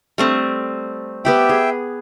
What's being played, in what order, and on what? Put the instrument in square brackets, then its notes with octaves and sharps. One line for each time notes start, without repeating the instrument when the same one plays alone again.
[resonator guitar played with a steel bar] G3 A3 C4
[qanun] B3 G4 B5 [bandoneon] E5 G5
[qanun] G#4